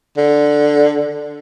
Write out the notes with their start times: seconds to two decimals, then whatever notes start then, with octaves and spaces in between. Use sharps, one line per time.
0.17 D3